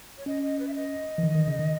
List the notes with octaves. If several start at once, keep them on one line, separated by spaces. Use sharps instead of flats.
C#5
C#4 D#5
D#5
B4
E5
D#5
E3
D#3
D#3
C#3
D#3